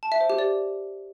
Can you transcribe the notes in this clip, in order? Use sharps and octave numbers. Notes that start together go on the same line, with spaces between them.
A5
E5
C5
G4
D5